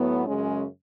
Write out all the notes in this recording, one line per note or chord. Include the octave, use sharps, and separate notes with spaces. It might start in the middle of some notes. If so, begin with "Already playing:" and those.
Already playing: A2 F#3 B3
F#2 C#3 G#3 C#4